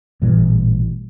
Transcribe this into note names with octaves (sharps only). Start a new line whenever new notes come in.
A1 A#2 E3 G3